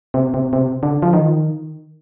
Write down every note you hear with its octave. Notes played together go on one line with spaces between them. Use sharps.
C3
C3
C3
D3
F3
D#3